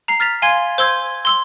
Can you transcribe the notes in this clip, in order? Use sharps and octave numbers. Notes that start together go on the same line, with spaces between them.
A#5 C7
F6 A6 B6 F7
F5 G#5 C6 G#6
C5 C6 E6 G#6
C6 E6 G7